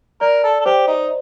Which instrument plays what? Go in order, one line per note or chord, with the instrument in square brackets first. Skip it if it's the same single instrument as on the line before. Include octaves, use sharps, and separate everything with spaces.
[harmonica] A#4 [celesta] D5
[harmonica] A4
A4
[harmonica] G4 [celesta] C5
[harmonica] D#4